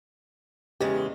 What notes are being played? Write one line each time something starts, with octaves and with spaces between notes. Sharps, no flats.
E2 C#3 G#3 G4